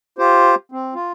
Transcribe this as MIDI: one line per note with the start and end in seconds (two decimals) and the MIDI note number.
0.19 0.55 65
0.19 0.55 67
0.19 0.55 72
0.72 0.94 60
0.95 1.12 65